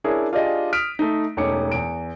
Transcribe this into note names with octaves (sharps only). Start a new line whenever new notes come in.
C#4 D4 E4 G#4 A#4 C#5
D4 F4 G4 G#4 D5 D#5
D#6 F6 B6 D7
A3 D#4
E1 A3 C#4 D#4 D6 C#7
E2 D7